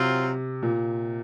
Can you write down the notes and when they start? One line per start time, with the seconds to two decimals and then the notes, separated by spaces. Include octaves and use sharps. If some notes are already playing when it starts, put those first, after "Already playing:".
Already playing: C3 F#3 C4 F4
0.62 A#2